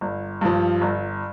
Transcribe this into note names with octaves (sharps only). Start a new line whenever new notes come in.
G1
G2 F3
G1